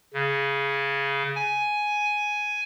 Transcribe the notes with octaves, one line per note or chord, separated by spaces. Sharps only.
C#3
G#5